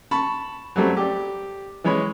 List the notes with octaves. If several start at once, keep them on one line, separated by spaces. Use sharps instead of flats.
A5 B5 C#6
F#3 G3 A3 C4
G4 D5
E3 G#3 C#5 B5